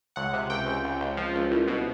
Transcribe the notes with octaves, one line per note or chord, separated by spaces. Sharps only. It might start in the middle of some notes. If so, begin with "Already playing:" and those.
C#2 F#5
C3
C#2 G5
C#2
C#2
C#2
F3
C#2
C2
B2